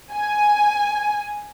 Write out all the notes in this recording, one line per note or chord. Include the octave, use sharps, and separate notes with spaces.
G#5